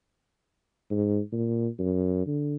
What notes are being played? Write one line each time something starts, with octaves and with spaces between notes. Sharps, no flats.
G#2
A#2
F#2
D3